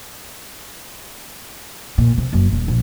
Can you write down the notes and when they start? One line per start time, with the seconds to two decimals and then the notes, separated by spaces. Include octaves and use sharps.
1.98 A#2
2.18 C3
2.33 F#1
2.52 D#1
2.68 A#1